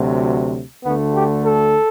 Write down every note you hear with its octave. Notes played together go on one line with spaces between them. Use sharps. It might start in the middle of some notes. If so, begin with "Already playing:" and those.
Already playing: D2 C3 F#3
D2 D3 A3 B3
G4
A4